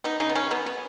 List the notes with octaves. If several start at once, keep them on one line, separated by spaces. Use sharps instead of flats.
B3 D#4
C#3 D#4
B3
C#3 C#4
F#3 B3
B3